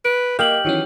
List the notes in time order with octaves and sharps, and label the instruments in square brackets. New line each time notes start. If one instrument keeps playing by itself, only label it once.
[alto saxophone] B4 [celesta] D7
[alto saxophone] A#3 [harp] G4 [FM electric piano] D#5 [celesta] F6 F#7
[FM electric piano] D#3 E3 C#4 [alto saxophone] F#3